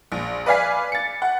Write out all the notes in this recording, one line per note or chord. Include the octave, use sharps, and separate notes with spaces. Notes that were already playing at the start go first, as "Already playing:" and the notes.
A#1
B4 D5 F5 G#5 B6
A6 C#7
F#5